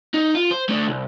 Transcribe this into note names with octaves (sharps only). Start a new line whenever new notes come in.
D#4
F4
C5
A3 D4
C2